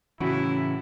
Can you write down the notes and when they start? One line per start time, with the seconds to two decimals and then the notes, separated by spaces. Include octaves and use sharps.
0.20 A2 C#3 E3 E4 F#4